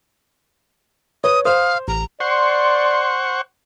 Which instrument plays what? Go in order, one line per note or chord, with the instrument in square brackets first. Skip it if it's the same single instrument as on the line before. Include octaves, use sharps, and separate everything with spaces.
[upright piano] B4 [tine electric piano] C#5 [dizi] D#6
[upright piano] C5 [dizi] F5 [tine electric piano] D#6
[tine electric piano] A1 [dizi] A#5
[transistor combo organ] C5 F#5 C#6 [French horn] D5 [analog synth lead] C6